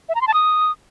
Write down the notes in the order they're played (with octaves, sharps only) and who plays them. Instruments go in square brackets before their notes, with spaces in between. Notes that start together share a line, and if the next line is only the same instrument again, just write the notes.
[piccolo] E5
A#5
C6
A5
D#6